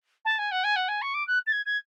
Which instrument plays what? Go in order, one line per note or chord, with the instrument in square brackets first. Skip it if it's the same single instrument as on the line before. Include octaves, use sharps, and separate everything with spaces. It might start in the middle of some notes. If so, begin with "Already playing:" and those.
[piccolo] A5
G#5
F#5
G#5
F#5
G#5
C#6
D6
F#6
A6
G#6
G#6